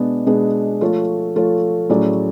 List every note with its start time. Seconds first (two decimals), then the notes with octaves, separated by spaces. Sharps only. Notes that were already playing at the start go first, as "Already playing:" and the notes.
Already playing: B2 G#3 B3 D4 G#4
0.26 B2 G#3 B3 D4 G#4
0.81 F3 A3 F4 A4 C#5
1.36 F3 A3 F4 A4 C#5
1.90 A2 F#3 C#4 G#4 D5